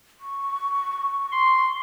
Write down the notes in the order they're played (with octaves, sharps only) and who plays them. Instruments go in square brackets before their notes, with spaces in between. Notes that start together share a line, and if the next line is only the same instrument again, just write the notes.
[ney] C#6
[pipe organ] C6